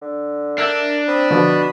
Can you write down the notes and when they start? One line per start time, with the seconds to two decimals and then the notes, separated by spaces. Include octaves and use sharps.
0.02 D3
0.58 D4 A#4 E5 E6 G6
1.08 C4 B5 D#6
1.31 B2 D3 F3